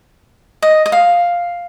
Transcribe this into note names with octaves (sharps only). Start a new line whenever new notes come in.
D#5
D#5
F5